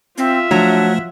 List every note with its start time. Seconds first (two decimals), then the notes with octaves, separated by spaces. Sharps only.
0.18 C4 F4 E5
0.51 F3 F#3 A3 D4